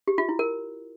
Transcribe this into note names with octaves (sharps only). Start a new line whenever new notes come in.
G4
F4
E4
A#4